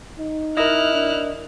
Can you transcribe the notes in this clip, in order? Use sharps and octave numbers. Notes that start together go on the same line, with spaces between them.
D#4
E4 A#4 D#5 F6 F#6
D4